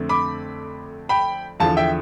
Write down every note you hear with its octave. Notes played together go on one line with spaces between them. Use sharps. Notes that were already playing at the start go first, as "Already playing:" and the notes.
Already playing: F2 D3 A3 C4
B5 D6
G5 B5
E2 D3 F3 F5 A5
E5 G5